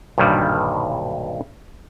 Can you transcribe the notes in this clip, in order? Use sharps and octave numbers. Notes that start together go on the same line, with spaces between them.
B1 G2 A#2 D3 D#3 G3